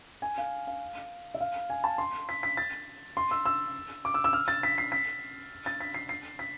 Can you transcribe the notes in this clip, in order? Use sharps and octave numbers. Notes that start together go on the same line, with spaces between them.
G#5
F5
F5
E5
F5
G#5
A5
C6
B6
B6
A6
C6
E6
E6
D6
E6
E6
F6
A6
B6
C7
B6
A6
B6
C7
C7
B6